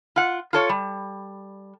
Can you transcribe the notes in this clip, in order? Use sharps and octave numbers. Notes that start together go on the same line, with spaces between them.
F4 F#5
F4 A4 C#5
G3